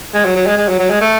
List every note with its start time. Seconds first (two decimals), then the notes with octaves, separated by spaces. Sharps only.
0.15 G#3
0.25 F#3
0.36 F#3
0.47 G#3
0.58 G#3
0.69 F#3
0.79 F#3
0.90 G#3
1.01 A3